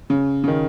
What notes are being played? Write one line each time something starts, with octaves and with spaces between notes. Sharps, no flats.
C#3
C#3
D#3